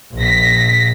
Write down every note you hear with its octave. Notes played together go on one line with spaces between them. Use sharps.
A#1 A#6 B6